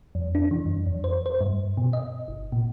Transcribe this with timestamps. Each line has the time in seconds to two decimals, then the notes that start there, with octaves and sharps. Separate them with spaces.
0.15 F2
0.35 D4
0.51 E3
0.66 F#2
0.86 F2
1.04 C5
1.26 C5
1.41 G2
1.77 B2
1.93 D#5
2.28 G1
2.52 A#2